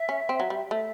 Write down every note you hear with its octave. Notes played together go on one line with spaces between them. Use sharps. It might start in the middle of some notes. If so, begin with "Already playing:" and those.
Already playing: E5
C#4
C4
F#3
G3
A3 E5